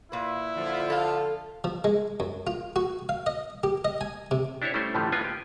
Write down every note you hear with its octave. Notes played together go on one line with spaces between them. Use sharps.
A#2 E4 B4
D3 F3 F4
A4 F5
F3
G#3
F#2
F4
F#4
F5
D#5
G4
D#5
G#5
C3
D4 E4 G4 C5 C#5
G3 A3 C#4 E4 C5
A2 D3 E3 F3 G3 A3
A#3 B3 F4 G#5
G4